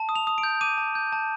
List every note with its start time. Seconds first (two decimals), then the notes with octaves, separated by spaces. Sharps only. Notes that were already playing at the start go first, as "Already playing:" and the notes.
Already playing: A5
0.09 D#6
0.15 F7
0.27 D#6
0.38 D7
0.43 G6
0.61 D6 D#7
0.78 A5
0.95 G6
1.12 A5